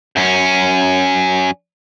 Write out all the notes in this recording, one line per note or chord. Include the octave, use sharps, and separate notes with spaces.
F#2 C#4